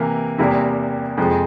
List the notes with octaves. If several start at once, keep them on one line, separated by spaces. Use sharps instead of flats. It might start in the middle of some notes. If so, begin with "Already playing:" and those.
Already playing: C3 E3 A#3 A#4
E2 C3 G3 A#3 E4
F2 C3 F3 G#3